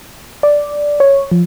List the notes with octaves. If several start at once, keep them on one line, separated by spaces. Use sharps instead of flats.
D5
C#5
F3